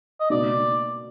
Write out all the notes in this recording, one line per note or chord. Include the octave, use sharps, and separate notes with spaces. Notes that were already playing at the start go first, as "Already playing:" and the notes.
D#5
B2 A#3 D#4 D5